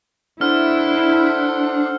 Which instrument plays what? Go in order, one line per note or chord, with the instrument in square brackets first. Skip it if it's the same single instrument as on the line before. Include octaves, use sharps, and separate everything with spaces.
[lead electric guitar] D4 [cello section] E4 [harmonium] A4 C5 F#5 [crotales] F6